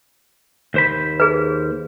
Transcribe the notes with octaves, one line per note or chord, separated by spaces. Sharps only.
D#2 C5 B5
G#4 B4